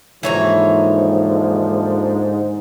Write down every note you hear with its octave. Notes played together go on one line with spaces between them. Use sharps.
D#2 G#2 D3 E3 F3 C#5 A#5